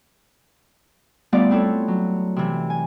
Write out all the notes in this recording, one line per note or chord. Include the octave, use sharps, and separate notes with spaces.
G3 A3 B3 F4 D5 F5
C4 E4 F4 A4 C#5
F#3
C3 E3
G#5